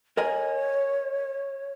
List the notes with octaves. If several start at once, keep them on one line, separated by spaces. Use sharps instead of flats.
A#4 C#5 D#5 G#5